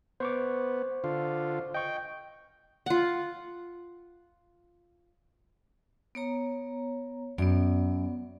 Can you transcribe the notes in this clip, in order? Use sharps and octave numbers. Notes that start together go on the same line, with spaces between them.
B3 C5 C#6 D6
D3 F4
D#5 G5 C#6
F4 F#5
B3 C#5 A#5
F#2 B3 D5